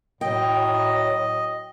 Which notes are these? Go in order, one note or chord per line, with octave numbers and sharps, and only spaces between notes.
A2 F#3 D#5 G5